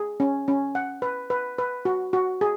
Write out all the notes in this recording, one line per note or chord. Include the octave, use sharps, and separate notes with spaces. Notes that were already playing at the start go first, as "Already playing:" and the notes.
Already playing: G#4
C#4
C#4
F#5
B4
B4
B4
F#4
F#4
G#4